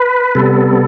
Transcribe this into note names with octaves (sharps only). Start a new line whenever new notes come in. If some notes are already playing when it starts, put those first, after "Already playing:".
Already playing: B4
C3 G3 B3 A4